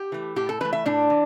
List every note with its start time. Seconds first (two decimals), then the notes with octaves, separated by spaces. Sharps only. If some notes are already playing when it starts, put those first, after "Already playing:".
Already playing: G4
0.12 E3 A3
0.36 A2 G4
0.49 A4
0.61 E3 A3 B4
0.73 E5
0.86 A2 D4
1.10 E3